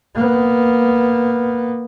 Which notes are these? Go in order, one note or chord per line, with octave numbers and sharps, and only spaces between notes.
A#3 B3